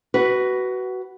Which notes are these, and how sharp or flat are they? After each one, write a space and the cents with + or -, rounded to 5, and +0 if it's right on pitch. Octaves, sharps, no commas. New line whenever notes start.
F#4 +20 B4 +0